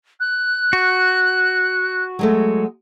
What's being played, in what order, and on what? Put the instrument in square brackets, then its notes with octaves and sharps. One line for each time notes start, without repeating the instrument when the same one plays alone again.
[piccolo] F#6
[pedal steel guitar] F#4
[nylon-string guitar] F#3 G#3 A3